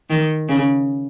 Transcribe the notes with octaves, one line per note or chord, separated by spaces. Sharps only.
D#3
C#3